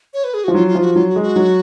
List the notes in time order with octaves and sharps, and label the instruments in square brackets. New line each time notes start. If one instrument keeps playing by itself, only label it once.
[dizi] C#5
B4
G#4
F#4
[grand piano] F3
[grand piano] F#3 [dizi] F4
[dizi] F4
[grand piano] F3
[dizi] F#4
[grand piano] F#3 [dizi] F4
[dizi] F#4
[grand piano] G#3
[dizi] F#4
[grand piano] F#3